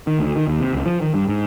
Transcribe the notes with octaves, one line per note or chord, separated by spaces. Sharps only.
D#3
D2
D#3
D#2
C3
C#2
F3
D#3
G2
G#2